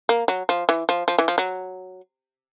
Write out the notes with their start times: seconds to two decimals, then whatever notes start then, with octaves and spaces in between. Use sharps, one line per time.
0.09 A#3
0.28 F#3
0.49 F3
0.69 E3
0.89 F3
1.08 F3
1.18 E3
1.28 F3
1.38 F#3